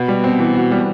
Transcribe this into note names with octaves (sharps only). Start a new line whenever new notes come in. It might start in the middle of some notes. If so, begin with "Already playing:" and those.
Already playing: B2 F#4
G3
C4
E3
F#4
G3